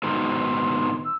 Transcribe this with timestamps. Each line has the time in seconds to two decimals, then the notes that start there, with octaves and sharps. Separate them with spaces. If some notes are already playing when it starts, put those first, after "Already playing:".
0.03 G#2 B2 D#3 C6
1.04 E6